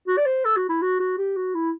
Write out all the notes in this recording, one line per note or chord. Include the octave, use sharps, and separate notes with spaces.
F#4
D5
C5
A4
F#4
E4
F#4
F#4
G4
F#4
E4